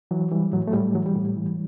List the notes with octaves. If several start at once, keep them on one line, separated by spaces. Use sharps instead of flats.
E3 F#3
E3 G3
A2 F#3
A3
A2 G3
E3 F#3
G3
A2
E3